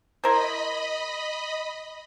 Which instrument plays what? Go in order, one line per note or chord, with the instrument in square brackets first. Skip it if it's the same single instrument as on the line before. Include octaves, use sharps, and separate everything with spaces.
[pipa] E4 A#4 C5 [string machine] D#5 B5